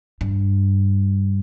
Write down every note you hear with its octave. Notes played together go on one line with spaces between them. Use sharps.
G2